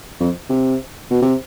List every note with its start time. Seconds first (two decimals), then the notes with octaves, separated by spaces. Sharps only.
0.20 F2
0.50 C3
1.11 B2
1.22 C3